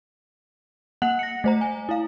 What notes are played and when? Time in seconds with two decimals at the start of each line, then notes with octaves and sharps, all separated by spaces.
1.02 A#3 F#5 F#6 F#7
1.19 A#6 C#7
1.44 A3 C5 A#5
1.61 G#5
1.89 E4 F5